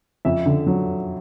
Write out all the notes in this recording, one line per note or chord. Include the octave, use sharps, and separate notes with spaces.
F2 E5
D3
F#3